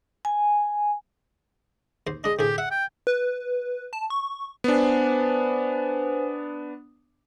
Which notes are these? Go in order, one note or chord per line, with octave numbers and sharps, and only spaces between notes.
G#5
D#2 C5
G#3 D4 D#5
D2 A2 G4 G#4
E5 F#5
G5
B4
A5
C#6
B3 D4 B4 C5 G#5